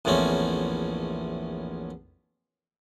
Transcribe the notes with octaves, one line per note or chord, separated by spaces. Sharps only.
A#1 E2 A2 C4 C#4